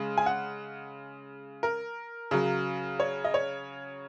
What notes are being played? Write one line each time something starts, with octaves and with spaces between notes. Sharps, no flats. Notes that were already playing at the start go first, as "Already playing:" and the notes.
Already playing: C#3 G#3
G#5
F#5
A#4
C#3 F#3
C#5
D#5
C#5